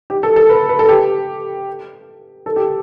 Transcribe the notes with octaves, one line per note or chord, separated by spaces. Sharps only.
G4
A4
A4
B4
B4
A4
G4
A4
G4